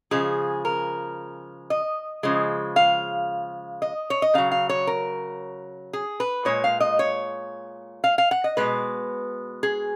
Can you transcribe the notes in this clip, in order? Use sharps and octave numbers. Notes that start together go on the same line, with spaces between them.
C#3 F3 G#3 G#4
A#4
D#5
C#3 F3 G#3
F5
D#5
C#5
D#5
C#3 F#3 F5
F5
C#5
A#4
G#4
B4
A#2 G#3 C#5
F5
D#5
C#5
F5
F5
F#5
D#5
B2 G#3 B4
G#4